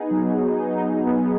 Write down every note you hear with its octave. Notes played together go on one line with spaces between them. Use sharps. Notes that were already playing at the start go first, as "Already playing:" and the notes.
Already playing: B3 D#4 G#4
F#3
D#4
B3